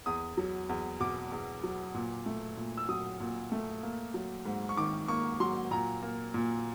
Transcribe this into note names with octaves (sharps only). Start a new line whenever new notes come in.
E2 D#6
F#3
E2
B2 D6
E2
F#3
A#2
A3
A#2
E6
F#3 D#6
A#2
A3
A#3
F#3
G#2
C#6
D#3 D6
A#3 C#6
F#3 C6
A#2 A#5
A#3
A#2